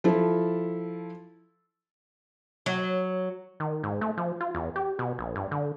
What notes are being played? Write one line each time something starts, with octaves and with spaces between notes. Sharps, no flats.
F3 E4 A4
F#3
D#3
G#2
A3
F3
F4
E2
G4
B2
A#1
G2
D3